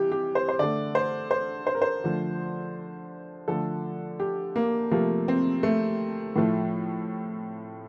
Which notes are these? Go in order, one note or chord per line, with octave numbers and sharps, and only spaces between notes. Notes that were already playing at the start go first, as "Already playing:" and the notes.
Already playing: C3 E3 G3 G4
G4
C5
C5
D3 A3 D5
C5
C5
C5
A#4
C5
D3 F3 A3
D3 F3 A3 A4
G4
A#3
C3 F3 A3 A#3
C4
A3
A2 F3 A3